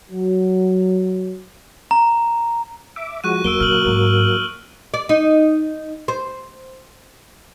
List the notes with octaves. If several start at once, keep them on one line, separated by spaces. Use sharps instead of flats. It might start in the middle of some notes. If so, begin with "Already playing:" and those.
F#3
A#5
E5 D6
F3 G#3 F#4 C#6 F#6 D#7
E2 F#3 A#3 E6 D7 G7
A#2 D3 F6 F#7
G#2
D5
D#4
C5